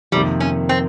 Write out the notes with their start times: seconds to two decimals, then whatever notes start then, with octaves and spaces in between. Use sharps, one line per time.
0.12 F2 C3 D#3 G3 A#3
0.40 C#4
0.69 C4